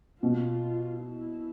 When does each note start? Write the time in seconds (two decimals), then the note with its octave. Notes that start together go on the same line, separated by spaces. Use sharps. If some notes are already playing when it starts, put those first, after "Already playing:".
0.22 B2 F4
1.01 E4